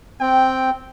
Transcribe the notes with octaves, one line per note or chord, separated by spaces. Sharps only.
C4 G5